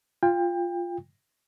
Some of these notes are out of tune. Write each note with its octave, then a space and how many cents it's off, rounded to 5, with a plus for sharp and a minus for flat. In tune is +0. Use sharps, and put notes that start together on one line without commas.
F4 +0 G5 +25